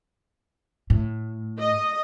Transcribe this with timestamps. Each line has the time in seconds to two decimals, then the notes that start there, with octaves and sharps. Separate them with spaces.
0.90 A2
1.59 D#5